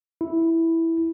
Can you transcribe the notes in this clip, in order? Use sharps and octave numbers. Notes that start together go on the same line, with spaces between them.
E4